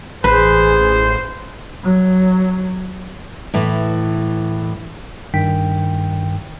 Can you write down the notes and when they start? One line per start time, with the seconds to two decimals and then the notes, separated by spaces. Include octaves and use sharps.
0.24 A1 G#4 B4 C5
1.84 F#3
3.54 A2 E3
5.34 G2 D#3 G5 B6